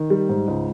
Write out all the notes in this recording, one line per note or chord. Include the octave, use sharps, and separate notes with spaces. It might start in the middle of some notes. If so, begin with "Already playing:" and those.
Already playing: D#3
G3
G#2
C#2